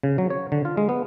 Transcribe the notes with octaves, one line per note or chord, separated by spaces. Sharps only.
C#3
F#3
C#5
D3
F4
G#3
B3